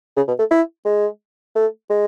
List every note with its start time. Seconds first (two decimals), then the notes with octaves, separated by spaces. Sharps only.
0.16 C#3
0.28 B2
0.39 A3
0.51 E4
0.85 G#3
1.56 A3
1.90 G#3